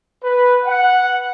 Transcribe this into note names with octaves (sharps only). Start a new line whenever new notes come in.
B4
F#5